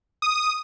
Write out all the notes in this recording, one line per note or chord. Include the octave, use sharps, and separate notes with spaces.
D#6